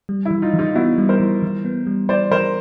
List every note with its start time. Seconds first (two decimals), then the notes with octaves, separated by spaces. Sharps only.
0.09 G3
0.25 E4
0.31 E3
0.42 D#4 F4
0.54 E3
0.59 D#4 F4
0.75 B3 E4 F#4
0.98 G3
1.09 A#4 C5
1.20 E3
1.42 E3
1.65 B3
1.87 G3
2.09 E3 C5 D5
2.31 E3 A#4 C5